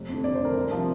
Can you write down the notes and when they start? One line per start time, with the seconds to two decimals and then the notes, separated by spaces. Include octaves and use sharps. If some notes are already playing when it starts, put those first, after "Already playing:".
Already playing: F1
0.09 F2 D3
0.24 F1 D5
0.35 C5
0.40 F2 D3 A#4
0.55 C2
0.71 C3 F3